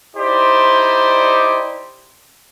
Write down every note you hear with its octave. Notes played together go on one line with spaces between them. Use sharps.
D#4 E4 G4 C5 D5